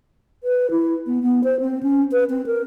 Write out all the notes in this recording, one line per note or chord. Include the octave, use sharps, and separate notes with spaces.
B4
E4
B3
B3
C5
C4
C#4
B4
C4
A#4